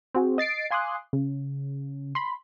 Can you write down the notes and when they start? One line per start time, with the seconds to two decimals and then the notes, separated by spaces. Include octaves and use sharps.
0.14 C4 F#4 G#4
0.38 D#5 A6 C7 D7
0.71 F5 G#5 C6 D6 D#6 F#6
1.13 C#3
2.15 B5 C6